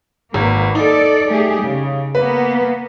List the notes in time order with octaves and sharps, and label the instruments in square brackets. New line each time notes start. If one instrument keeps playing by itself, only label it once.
[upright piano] G#1 [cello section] A#3 B4
[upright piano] D#4 [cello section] A4 D5
[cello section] A3 G4 G#4
C#3
[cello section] A#3 B3 [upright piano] B4